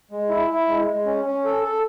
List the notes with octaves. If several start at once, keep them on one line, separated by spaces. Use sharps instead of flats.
G#3
E4
E4
G#3
G#3
C#4
C#4
A4
A4